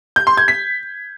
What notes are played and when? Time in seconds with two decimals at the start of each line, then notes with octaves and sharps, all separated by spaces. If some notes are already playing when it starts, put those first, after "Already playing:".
0.16 G6
0.27 C6
0.37 G#6
0.48 B6